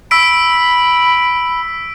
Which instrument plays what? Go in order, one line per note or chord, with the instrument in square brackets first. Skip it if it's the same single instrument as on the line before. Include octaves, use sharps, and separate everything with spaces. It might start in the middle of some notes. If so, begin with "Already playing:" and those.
[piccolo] B5 [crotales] E6 B6 D7